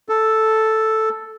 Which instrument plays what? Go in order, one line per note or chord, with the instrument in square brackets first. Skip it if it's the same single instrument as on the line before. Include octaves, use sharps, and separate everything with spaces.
[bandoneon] A4